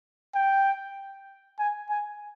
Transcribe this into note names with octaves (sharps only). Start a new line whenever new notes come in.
G5
G#5
G#5